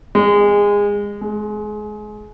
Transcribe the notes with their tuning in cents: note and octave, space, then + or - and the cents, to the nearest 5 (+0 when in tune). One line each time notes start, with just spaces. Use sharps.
G#3 -25
G#3 +25